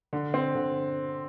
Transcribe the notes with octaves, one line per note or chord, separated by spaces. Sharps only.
D3
C4
D3